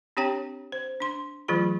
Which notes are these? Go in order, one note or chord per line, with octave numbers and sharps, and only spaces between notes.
C4 D4 G4 C#5 G5 A#5
C5
D4 C6
E3 F#3 A3 F4 G#4 B5